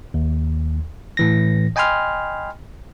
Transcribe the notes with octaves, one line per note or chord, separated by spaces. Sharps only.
D#2
A2 E3 A#6
D#5 G5 G#5 B5 C6 F6